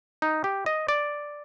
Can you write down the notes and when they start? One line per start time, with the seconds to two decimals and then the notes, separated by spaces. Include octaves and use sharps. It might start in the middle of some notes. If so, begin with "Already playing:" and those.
0.22 D#4
0.44 G4
0.66 D#5
0.88 D5